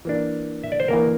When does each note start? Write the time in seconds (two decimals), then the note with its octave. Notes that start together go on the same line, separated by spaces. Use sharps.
0.05 E3 A#3 D4
0.64 E5
0.72 D5
0.80 C5
0.88 E3 A#3 D4 A#4